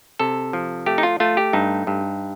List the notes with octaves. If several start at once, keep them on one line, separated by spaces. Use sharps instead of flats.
C3 A4
F3
A3 G4
D#4
F4
A3 F4
G4
G2 D#4
G2